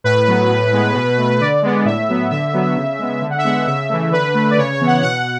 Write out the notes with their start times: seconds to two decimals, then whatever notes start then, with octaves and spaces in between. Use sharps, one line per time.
0.04 A2 B4
0.27 F#3 B3
0.50 A2
0.73 G#3 B3
0.94 B2
1.17 A3
1.40 D3 D5
1.62 G#3 B3
1.85 A2 E5
2.09 F#3 B3
2.30 D3 E5
2.53 F#3 B3
2.76 C#3
2.99 G#3 B3
3.22 D3
3.30 F#5
3.38 E5
3.45 G#3 B3 F#5
3.66 C#3 E5
3.89 E3 A3
4.11 D3 B4
4.34 A3
4.50 D5
4.57 C#3 C#5
4.73 C#5
4.80 E3 B3
4.87 F#5
5.02 B2 F#5
5.17 F#5